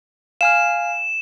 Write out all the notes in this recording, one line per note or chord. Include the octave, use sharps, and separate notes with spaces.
F5 G#5 F6 E7